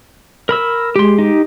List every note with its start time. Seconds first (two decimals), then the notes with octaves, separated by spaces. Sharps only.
0.49 A#4 B5 E6
0.96 G#3 G4 C6
1.19 D#4 G4